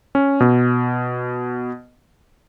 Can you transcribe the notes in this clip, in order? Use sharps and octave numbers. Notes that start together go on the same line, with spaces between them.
C#4
B2